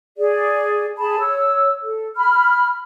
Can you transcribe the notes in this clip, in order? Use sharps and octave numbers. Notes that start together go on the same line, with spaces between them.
G#4 D5
G#4 A5 B5
C#5 E6
A4
B5 F6